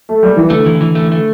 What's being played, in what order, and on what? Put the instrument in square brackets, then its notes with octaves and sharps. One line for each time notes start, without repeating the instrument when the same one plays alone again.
[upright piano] A3
G3
E3
[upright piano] D3 [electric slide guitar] A3
[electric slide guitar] E3
E3
A3
A3